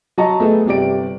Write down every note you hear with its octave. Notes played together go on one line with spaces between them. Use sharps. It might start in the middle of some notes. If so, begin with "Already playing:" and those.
F#3 D#5 A5 A#5 C#6
A3 B3 G#4 A4
G1 C3 G4 D5 D7